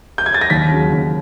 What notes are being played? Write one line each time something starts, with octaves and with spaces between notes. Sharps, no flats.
G6
G#6
A6
A#6
D#2 B6
C#3 F#3
D#2